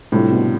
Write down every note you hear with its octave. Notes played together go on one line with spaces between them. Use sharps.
A2 C3 G3 D4 F4 A4
B2